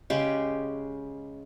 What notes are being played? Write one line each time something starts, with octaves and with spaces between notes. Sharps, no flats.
C#3 G#3 G4